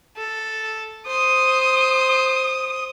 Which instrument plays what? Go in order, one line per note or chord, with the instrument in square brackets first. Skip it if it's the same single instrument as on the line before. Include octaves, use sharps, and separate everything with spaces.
[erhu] A4
[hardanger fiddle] C5 [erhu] D#6